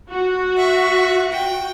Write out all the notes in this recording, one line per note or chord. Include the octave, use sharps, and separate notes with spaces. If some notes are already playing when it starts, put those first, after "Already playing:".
F#4
E5 C#6
G5